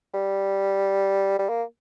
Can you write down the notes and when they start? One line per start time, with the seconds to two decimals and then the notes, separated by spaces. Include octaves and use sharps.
0.14 G3
1.39 G3
1.49 A#3